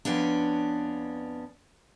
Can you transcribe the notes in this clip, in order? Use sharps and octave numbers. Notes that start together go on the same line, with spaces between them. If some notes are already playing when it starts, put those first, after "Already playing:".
F2 B3 C#4 D4